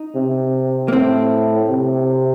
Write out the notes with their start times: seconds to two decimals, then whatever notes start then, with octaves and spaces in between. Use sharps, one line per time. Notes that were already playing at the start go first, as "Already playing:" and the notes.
Already playing: D#4
0.15 C3
0.88 A#3
0.93 A2 C4
1.70 C3